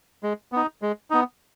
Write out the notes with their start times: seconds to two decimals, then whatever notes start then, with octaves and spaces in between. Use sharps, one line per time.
0.23 G#3
0.52 B3 D#4
0.82 G#3
1.10 B3 D#4